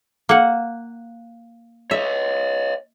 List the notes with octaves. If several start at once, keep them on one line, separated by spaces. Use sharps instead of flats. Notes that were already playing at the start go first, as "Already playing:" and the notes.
A#3 F#5
C#5 D#5 E5